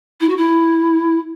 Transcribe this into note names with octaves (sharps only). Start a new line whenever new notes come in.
E4
F#4
E4